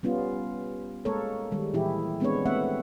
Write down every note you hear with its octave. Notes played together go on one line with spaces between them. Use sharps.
G3 B3 C#4 F4
G#3 A#3 A4 A#4 C#5
D#3 G3 G#3
A#2 E3 E4 G4 G#4
G#3 B3 C4 D4 B4 C#5
A3 B3 C4 E5 F#5